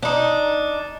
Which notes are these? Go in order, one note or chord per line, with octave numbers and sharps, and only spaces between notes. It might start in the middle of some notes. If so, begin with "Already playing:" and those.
D4 D#4